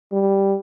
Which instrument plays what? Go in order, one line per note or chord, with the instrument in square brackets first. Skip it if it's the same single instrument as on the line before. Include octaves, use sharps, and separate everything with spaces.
[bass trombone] G3